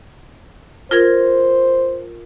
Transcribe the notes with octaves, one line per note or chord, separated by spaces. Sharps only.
F4 A#4 C5 G#6